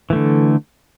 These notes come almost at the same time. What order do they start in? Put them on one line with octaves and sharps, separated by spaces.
E3 A3 D3